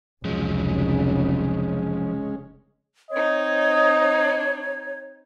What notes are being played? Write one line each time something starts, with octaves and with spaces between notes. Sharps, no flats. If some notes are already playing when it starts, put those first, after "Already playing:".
F1 C#2 C#3 F3 F#3 G#3 C#4
C4 D#4 C#5 D#5